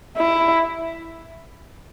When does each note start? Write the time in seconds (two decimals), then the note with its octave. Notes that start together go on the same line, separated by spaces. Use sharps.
0.18 E4